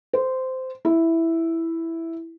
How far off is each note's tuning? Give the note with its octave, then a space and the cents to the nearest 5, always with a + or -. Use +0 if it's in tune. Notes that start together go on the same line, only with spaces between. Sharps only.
C5 -15
E4 +0